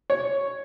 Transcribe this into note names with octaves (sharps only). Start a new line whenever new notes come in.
C#5